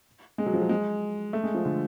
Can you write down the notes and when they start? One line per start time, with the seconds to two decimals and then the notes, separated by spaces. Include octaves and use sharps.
0.38 G#3
0.46 F#3
0.53 F3
0.62 F#3
0.69 G#3
1.33 A3
1.44 G#3
1.54 F3
1.65 D3